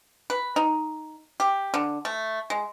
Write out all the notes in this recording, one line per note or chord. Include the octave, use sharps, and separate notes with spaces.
B4
D#4
G4
D3
A3
G#3